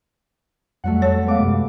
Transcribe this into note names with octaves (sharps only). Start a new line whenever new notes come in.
F2 F#3 G3 A3 F#4 F#5
A4 C#5
G#3 B3 F5 D6
F#2 C3 G#3